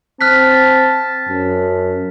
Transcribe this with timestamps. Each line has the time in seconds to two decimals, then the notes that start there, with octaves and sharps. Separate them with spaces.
0.21 C4 A5 F6 F#6 B6
1.29 F#2